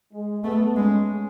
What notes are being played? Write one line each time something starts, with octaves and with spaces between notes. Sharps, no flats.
G#3
A3 B3
G#3 C#4